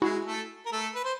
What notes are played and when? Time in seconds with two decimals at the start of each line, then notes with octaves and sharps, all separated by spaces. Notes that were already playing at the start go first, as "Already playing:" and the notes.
0.02 G#3 E4 F#4 G#4
0.25 A3 A4
0.66 A#4
0.72 A3 A4
0.95 B4
1.04 C5